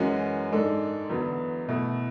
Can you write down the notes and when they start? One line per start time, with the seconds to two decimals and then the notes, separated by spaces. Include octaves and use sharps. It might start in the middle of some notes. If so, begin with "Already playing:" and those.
Already playing: F#2 E3 G#3 C#4 F#4
0.51 G#2 G#3 D4 A4
1.10 E2 D3 F#3 B3
1.69 B2 A3 E4